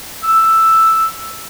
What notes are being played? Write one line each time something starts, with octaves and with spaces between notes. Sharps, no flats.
E6